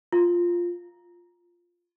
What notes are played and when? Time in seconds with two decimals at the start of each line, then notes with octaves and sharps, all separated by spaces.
0.13 F4